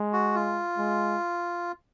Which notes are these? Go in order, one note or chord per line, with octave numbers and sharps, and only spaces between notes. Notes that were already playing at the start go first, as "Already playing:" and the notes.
Already playing: G#3
F#4
F4
G#3